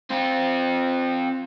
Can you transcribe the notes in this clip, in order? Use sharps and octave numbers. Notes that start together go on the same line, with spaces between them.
C4 F4